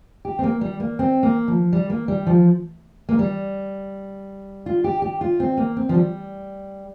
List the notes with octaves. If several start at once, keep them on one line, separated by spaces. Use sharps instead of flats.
G4
C4
A#3
G3
A#3
C4
A#3
F3
G3
A#3
G3
F3
A#3
G3
F4
G4
G4
F4
C4
A#3
C4
F3
G3